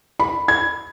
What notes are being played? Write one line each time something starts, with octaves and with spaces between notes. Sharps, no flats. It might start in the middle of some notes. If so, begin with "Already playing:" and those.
B5
G#6